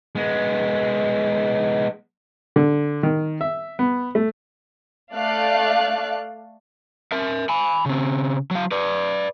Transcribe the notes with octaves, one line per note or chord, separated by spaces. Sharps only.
G#3 B3
D3
D#3
E5
B3
A3
A3 D5 F5 F#6
A#4 E5
G#5 B5
C#3 C4
F#3 F5
B4 D5